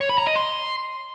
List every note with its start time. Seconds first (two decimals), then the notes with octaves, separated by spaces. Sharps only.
0.01 C#5
0.09 B5
0.18 A#5
0.27 D#5
0.36 C6